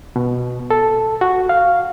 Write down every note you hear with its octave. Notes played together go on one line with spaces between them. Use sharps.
B2
A4
F#4
F5